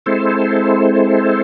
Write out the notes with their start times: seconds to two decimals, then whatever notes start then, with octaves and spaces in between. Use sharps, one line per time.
0.06 G#3 C4 E4 A4 C5